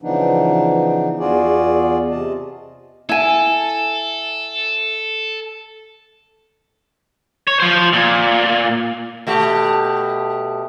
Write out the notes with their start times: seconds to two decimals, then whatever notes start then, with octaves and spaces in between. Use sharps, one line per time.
0.02 C#3 E3 F3 B3 D4 D#4
1.19 E2 F4 F#4 G#4 D5
2.11 C3 D#5 A5
3.09 E4 A4 G#5
7.47 C#5
7.60 F3 C5
7.93 A#2
9.27 B2 A3 G4